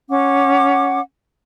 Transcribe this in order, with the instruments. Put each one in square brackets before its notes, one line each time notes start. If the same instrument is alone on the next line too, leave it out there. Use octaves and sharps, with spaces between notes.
[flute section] C#4 F#5 D6